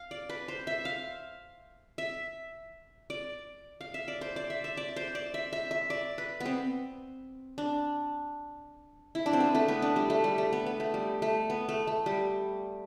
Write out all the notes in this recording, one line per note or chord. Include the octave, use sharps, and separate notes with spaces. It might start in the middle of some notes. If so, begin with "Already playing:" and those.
Already playing: F5
D5
B4
C5
E5
F5
E5
D5
F5
E5
D5
C5
D5
E5
E5
D5
C5
D5
E5
E5
E5
D5
B4
B3 C4
D4
E4
D4
C4
B3
A3
B3
D4
G3
A3
G3
A3
B3
B3
A3
G3
A3
B3
A3
A3
G3